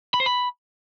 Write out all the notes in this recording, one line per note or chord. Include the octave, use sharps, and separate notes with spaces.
B5
C5
B5